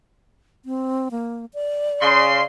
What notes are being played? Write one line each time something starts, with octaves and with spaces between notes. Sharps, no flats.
C4
A#3
D5
C#3 C6